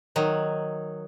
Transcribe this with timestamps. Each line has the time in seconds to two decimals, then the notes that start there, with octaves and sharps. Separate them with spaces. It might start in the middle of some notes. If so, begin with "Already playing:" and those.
0.16 D#3 F#3